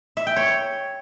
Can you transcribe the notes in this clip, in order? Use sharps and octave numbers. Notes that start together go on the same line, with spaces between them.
E5
G5
C#5